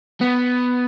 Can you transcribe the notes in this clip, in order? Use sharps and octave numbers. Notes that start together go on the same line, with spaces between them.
B3